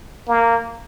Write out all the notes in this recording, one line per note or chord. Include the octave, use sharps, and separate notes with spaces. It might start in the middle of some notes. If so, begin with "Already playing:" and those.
A#3